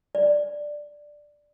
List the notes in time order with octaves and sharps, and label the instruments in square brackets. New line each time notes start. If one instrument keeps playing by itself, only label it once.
[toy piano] D5